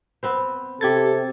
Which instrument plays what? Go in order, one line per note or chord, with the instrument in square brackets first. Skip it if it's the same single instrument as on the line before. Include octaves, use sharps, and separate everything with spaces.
[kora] B3 C4 C5
[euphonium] C3 [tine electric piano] G4 G#6 A6 [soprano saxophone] A4